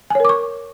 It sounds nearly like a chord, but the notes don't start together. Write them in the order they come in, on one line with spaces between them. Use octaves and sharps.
G#5 C#5 A#4 D6 C#6